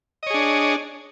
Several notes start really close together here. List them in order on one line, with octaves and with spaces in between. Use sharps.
D#5 C#5 G#4 D4